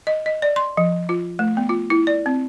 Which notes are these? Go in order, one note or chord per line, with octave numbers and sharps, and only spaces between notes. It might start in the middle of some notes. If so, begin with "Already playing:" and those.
D#5
D#5
D5
C6
F3
F4
A3
B3
F4
E4
D5
C4